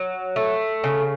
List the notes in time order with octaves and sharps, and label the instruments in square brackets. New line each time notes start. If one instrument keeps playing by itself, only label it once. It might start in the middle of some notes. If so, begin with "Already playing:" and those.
Already playing: [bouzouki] F#3
A3
C#3